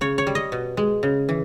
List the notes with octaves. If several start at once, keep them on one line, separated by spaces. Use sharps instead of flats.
C#3 C#5
C#5
G3
D#5
B2
G#3
C#3
E3